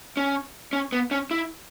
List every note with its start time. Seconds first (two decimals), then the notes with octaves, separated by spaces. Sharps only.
0.17 C#4
0.73 C#4
0.92 B3
1.11 C#4
1.31 E4